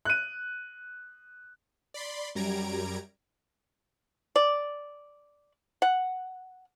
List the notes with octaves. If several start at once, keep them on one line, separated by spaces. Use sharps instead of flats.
F#6 D#7
D5 B5 C6
F#2 G3 A#5 G#6 D7
D5
F#5